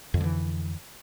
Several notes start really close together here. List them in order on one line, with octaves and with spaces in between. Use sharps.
F2 D3 F3 E3